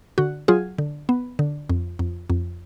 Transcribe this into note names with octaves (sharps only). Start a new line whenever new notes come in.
D3 F#4
F#3 F4 G#4
D3
B3
D3
F2
F2
F2